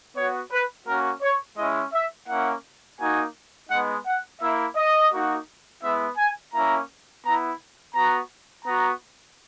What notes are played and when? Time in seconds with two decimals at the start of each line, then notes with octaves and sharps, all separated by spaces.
0.16 B3 F#4 C#5
0.52 B4
0.87 A#3 C#4 F#4 A#4
1.22 C#5
1.57 G#3 C#4 E4 D#5
1.93 E5
2.28 A#3 C#4 E4 F#5
3.00 A#3 D#4 F#4 G#5
3.69 G#3 B3 D#4 F#5
4.06 F#5
4.41 A#3 E4 E5
4.76 D#5
5.12 A#3 D#4 F#4
5.83 G#3 B3 E4 E5
6.18 G#5
6.54 A#3 C#4 E4 A#5
7.24 B3 E4 A#5
7.95 B3 F#4 A#5
8.65 B3 F#4 A#5